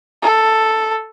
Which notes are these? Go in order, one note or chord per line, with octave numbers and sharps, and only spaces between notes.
A4